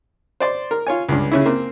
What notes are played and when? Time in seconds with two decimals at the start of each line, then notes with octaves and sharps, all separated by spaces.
0.40 C5 D5 C6
0.71 A#4
0.87 F4 C#5 G#5
1.09 C#2 G2
1.32 C#3 C#4 E4
1.46 A#3 C4